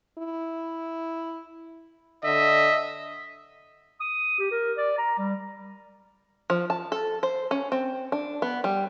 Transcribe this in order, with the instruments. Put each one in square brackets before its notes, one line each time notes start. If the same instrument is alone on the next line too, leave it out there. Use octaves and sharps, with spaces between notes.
[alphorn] E4
[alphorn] D3 [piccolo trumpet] D#5 [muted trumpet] E5
[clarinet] D#6
G4
A#4
D5
A#5
G3
[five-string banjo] F3
A5
A4
C5
C#4
C4
D4
B3
G3